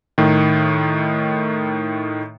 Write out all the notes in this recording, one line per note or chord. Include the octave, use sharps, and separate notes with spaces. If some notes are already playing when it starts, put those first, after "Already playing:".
A2 D#3